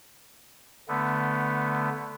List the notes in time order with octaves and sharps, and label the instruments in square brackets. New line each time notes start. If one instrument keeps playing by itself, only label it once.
[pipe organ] D3 A3 B3